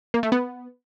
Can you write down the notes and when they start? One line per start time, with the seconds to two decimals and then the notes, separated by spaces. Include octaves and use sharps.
0.14 A#3
0.23 A3
0.32 B3